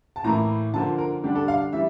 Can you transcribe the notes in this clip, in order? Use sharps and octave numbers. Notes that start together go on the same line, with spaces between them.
A5
A2 E3 A#3 E4 A#5
D3 F3 A#3 A5
A#4
D3 G3 D4 G4
A4
F5
E3 G3 E5